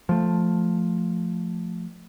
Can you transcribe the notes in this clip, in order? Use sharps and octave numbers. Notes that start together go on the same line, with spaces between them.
F3 A3